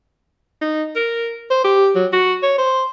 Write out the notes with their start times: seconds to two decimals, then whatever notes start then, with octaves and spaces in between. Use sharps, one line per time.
0.61 D#4
0.96 A#4
1.50 C5
1.64 G4
1.95 F#3
2.13 F#4
2.43 C#5
2.58 C5